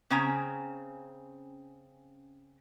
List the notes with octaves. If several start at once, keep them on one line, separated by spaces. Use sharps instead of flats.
C#3 C4 C#4 G#5 A#5